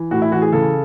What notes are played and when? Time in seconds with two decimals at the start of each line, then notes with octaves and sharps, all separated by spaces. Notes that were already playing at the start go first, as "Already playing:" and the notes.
Already playing: E3
0.11 A2 F#4
0.22 E4
0.32 E3 F#4
0.42 G#4
0.52 C#3 A4